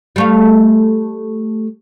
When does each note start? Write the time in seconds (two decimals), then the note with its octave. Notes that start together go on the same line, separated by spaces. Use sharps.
0.16 G3 A3 F5